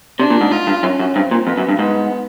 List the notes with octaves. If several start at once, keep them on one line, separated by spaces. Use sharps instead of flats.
C3 D4
A#2
G#2
G#2 F4
G2
F#2 C#4
F#2
G2 C4
A#2
F2 B3
F#2
G2
G#2 B3